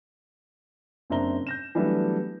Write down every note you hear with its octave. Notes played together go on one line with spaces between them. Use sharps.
F#1 C4 D4 E5 A#5 G7
G6 A#6 E7
E3 F#3 G3 A3 B3 D4